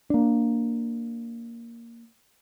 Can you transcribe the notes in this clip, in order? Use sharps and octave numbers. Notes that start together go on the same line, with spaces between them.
A#3 D4